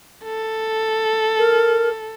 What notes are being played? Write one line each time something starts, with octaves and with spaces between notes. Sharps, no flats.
A4
A#4